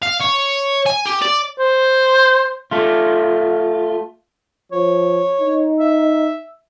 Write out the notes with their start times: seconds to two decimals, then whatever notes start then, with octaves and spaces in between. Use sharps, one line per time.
0.03 F5
0.21 C#5
0.86 G#5
1.06 G4
1.22 D5
1.59 C5
2.71 A3 F4
4.72 F3 C#5
5.41 D#4
5.80 E5